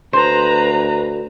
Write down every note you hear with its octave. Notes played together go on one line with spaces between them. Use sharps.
D2 B4 C5 A#5